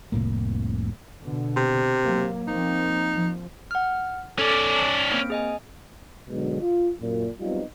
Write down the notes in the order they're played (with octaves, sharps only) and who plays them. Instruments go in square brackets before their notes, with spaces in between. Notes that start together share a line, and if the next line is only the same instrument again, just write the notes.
[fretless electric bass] F1 C2 A2 A#3
[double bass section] B2 D3
[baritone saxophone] C3
[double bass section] F#3 A#3
[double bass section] F3 A#3 C4 [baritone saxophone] D#4
[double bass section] F3
[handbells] F#5 F6
[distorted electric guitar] C#4 D5 [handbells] A4
[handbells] A5
A#3 C4 D7
G#4 D#5 G#5
[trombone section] G#2 B2 D3 F#3 G#3
F4
F#2 A#2
F#3 G3 B3 C4 D#4 F4